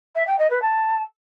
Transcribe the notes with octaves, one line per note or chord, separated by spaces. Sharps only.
E5
G5
D#5
B4
A5